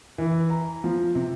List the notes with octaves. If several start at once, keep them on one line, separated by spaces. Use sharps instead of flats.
E3
A#5
F3
C3